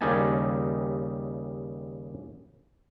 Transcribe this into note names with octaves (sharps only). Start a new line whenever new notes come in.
D#2 C#3 G3 D#4 G#5 A5